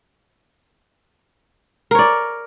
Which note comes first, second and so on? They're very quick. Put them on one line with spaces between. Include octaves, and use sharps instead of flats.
A#4 C#5 D5